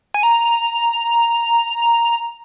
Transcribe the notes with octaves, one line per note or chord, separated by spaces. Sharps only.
G#5
A#5